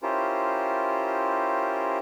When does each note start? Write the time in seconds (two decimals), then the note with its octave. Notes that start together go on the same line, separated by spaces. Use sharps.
0.03 C#4 E4 F4 G4 A#4 C5